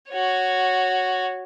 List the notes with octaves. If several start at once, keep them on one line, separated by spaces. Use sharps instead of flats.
F#4 C#5